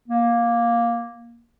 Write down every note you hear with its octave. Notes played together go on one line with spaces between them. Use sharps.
A#3